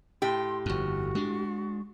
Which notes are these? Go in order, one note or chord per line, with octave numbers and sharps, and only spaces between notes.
A2 G4 C6
G1 F2 F#4
G#3 D4